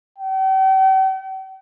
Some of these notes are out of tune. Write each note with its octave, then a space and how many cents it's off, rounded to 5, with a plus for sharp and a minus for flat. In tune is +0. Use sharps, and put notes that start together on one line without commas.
G5 -45